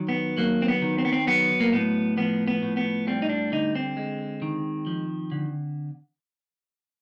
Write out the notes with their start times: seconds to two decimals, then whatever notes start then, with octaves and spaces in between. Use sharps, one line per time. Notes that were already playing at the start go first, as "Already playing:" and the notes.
Already playing: D#3 F#3
0.09 B3
0.37 F#3 A#3
0.62 C4
0.68 B3
0.82 D#3
0.98 C4
1.05 B3
1.12 C4
1.27 F#3 B3
1.60 A#3
1.73 A2 B3
2.17 F3 B3
2.48 B3
2.62 A2
2.77 B3
3.07 G3 C4
3.22 D#4
3.29 D4
3.52 D3 D#4
3.75 C4
3.97 G#3
4.42 D#3
4.87 F3
5.32 D3